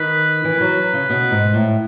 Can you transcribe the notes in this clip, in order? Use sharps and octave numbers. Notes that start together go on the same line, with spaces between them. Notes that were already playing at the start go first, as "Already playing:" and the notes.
Already playing: D#3 B4
E3
F#3
C#3
B2
G#2
A2